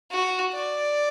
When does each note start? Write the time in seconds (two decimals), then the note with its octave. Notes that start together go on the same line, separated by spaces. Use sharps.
0.11 F#4
0.53 D5